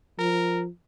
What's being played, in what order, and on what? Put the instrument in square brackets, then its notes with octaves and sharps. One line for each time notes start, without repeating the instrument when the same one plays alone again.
[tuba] F3 [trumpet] A#4